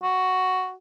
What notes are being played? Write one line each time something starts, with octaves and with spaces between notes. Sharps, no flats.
F#4